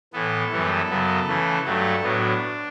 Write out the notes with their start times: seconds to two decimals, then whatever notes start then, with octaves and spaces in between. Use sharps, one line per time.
0.13 A2 E3 B3 A4
0.51 F#2 E3 G3 B3
0.89 F#2 C#3 F#3 B3
1.27 C#3 E3 A3
1.65 G2 F#3 A3 A4
2.03 A2 F#3 B3 D4